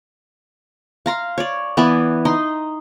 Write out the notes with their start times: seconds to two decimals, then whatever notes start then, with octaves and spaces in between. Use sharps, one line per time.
1.06 F5 A#5 C6
1.38 C#5 D5
1.77 E3 B3 D5 G#5
2.25 D#4 C6